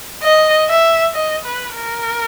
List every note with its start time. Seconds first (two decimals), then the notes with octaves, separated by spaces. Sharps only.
0.23 D#5
0.69 E5
1.15 D#5
1.45 B4
1.76 A#4